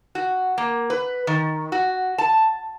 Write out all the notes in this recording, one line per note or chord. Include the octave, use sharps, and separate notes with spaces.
F#4
A#3
B4
D#3
F#4
A5